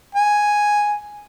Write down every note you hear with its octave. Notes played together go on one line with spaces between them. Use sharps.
G#5